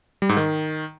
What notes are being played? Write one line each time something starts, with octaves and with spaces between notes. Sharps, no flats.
G3
G#2
D#3